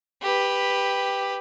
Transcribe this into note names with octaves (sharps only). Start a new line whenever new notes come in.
G4 B4